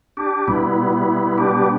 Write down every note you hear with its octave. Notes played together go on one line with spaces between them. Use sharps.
D4 G4
B2 G3 B3 E4
E4
D4 G4